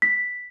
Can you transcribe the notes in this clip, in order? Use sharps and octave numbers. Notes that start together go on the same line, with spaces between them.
B6